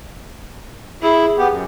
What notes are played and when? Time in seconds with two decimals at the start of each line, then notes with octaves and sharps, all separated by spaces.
1.03 E4 G#4
1.38 B3 G4
1.50 F#2